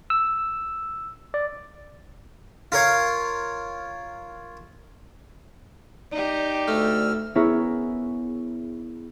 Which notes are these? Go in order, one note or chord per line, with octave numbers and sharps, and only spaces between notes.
E6
D5
F4 A#4 C#5 F5
D#4 G4 D5
D2 A3 E6 F6
B3 E4 G#4 A#4 C#5 E5